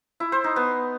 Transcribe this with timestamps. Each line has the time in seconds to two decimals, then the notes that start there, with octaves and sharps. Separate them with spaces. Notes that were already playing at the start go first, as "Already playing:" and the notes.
0.20 E4
0.32 C5
0.44 D#4
0.56 B3